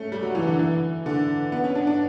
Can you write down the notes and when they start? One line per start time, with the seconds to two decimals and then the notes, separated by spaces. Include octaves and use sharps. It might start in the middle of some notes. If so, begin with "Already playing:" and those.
Already playing: A3 C#4
0.12 G3
0.23 F#3
0.35 E3
0.47 D3
0.59 E3
1.06 D3
1.52 B3
1.64 C#4
1.75 D4
1.87 D4